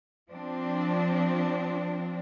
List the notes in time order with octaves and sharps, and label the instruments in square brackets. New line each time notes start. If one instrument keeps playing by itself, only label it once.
[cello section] F3 C4 D4